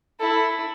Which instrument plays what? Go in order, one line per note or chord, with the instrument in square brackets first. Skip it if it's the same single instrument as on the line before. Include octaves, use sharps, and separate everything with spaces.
[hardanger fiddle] E4 [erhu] A4